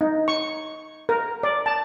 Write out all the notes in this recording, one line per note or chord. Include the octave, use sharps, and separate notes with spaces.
D#4
C#6
A#4
D5
A5